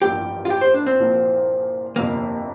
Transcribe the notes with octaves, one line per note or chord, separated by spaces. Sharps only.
A1 G2 F3 A#3 G4
F4
G4
C5
D4
C4
C2 A#2 F3 A#3
G1 F2 C3 A#3